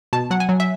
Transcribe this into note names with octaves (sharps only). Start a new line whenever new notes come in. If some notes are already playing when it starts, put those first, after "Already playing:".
B2 A5
F#3 F#5
G#5
F#3
E5